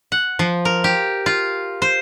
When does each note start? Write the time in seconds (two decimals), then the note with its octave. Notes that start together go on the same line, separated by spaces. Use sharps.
0.12 F#5
0.39 F3
0.65 A#4
0.84 G4
1.26 F4
1.82 C5